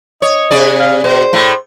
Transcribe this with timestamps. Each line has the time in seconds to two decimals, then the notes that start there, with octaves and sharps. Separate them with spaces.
0.22 C#5 D#5
0.51 C3 G#4 D5
0.80 F5
1.04 B2 C5
1.33 A2 A3